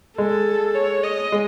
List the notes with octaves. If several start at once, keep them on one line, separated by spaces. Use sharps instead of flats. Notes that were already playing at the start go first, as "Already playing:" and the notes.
G#3 A4
C#5
D#5
G#3